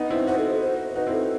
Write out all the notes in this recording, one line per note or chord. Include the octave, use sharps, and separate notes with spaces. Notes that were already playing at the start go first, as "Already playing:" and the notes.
Already playing: B3 D#4
C4 E4
D#4 F#4 C5
A4
A4
C5
C5
D#4 F#4 B4
C4 E4
A4